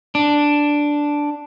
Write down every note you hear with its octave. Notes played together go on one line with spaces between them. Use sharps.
D4